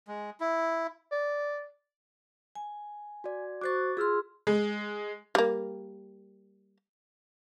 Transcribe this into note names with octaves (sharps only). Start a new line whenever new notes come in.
G#3
E4
D5
G#5
F#4 D5
F#4 C5 C#6 D6 F#6 A6
F4 G#4 C6 E6 F6
G#3
G3 A#3